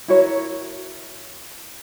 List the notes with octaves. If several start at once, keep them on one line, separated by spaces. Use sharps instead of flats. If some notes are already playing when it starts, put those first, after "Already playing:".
E4 F#4 A#4 C#5